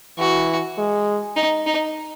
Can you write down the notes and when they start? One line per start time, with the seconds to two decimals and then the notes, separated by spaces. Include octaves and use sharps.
0.18 E3 F#4
0.78 G#3
1.36 D#4
1.67 D#4